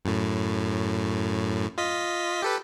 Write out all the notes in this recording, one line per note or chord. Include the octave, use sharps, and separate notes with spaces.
F#2 A2
F4 D#5 B6
G4 A4 B4